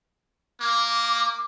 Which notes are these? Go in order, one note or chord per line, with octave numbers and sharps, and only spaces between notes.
A#3 D6